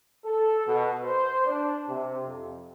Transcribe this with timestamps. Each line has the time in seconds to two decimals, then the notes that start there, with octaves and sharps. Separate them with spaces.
0.24 A4
0.66 B2
1.03 C5
1.45 D4
1.87 C3
2.25 F2